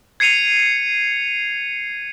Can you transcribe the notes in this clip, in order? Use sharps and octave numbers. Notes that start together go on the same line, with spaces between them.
G#6 C7 C#7 D#7 F7